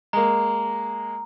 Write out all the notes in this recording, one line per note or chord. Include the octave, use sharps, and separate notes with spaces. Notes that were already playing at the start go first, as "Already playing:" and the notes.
G#3 A#3 A#5